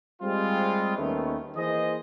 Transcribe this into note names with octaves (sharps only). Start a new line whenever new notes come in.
G3 G#3 C4 F4
D#2 D#3 A3 B3 C#4
E3 A#3 G#4 C5 D#5